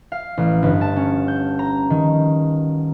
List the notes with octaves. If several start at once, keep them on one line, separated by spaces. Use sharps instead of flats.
F5
A1
G1
A5
C#4
G6
A#5
D#3